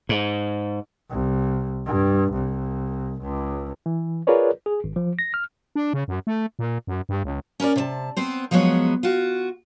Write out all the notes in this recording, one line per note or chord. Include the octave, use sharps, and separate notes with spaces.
G#2
C2
G2
C2
C#2
E3
F4 G#4 A#4 B4 C#5 D5
G#4
G#1
F3
A#6
F6
D4
C#3
F#2
A3
A#2
F#2
G2
C#2
C#4 A#4 B4 D5
C3 D5 A5
B3 C4 C5
F3 F#3 G#3 B3 C#5
F4 F#4